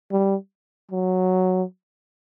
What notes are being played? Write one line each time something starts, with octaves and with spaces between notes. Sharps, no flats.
G3
F#3